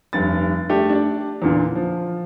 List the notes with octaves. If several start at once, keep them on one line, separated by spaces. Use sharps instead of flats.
F1 G2 A6
A3 D4 G4
D4 D5
E2 A#2 D3
F3